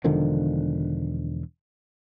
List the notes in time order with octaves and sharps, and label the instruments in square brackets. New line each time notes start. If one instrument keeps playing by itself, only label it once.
[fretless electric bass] E1 D3 D#3 F3